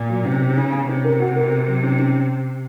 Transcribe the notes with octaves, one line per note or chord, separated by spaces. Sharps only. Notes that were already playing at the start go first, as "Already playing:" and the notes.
Already playing: A#2
F#3
C3 C#4
C#4
C#3 C#4
C#4
C3 C#4
A#4
F#4
A#4
A#4
F#3
C#4
C#4